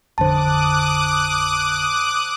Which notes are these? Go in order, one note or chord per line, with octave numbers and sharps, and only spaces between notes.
A1 F2 D3 C5 A5 D6 D#6 F#6